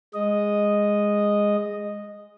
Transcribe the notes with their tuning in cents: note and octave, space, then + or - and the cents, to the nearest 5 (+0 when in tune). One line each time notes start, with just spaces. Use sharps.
G#3 -10 D#5 -5